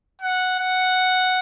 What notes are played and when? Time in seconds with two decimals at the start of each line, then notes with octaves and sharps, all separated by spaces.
0.21 F#5
0.60 F#5